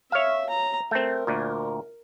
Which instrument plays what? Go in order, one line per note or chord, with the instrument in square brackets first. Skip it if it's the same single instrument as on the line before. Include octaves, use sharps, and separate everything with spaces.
[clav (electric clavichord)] C#5 F5 [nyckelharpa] E5
[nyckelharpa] A#5
[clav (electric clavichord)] A3 C4 [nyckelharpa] A#4
[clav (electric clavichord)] D2 A#2